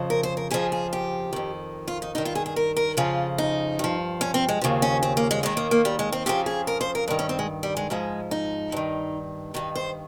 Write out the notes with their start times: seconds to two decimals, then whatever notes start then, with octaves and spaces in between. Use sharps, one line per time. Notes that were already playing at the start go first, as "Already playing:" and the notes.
Already playing: F2 C#3 F3
0.10 A#4
0.23 C5
0.37 A#4
0.51 F2 C#3 F3 G#4
0.72 G#4
0.93 G4
1.33 F2 D#3
1.88 F4
2.02 D#4
2.15 G2 D#3 D#4
2.25 F4
2.35 G#4
2.46 G#4
2.56 A#4
2.77 A#4
2.97 F2 C#3 F3 F4
3.38 D#4
3.79 G2 F3
4.21 C#4
4.34 C4
4.49 G#3
4.61 D#2 C#3 F3
4.82 C#4
5.03 C4
5.17 A#3
5.31 G#3
5.43 D#2 D#3 G#3
5.57 A#3
5.71 A#3
5.85 G3
5.99 G#3
6.12 C4
6.26 F2 C#3 F3 G4
6.46 G#4
6.67 A#4
6.81 C5
6.95 A#4
7.08 G2 A#4
7.10 D#3
7.19 C#4
7.29 C4
7.39 G#3
7.63 G3
7.77 G#3
7.90 G#2 F3 G#3
8.31 D#4
8.72 G2 D#3
9.54 G2 D#3 D#4
9.75 C5